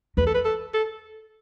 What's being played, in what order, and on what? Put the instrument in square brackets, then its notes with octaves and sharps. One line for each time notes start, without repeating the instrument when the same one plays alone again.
[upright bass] E2 [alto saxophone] B4
[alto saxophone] A4
B4
A4
A4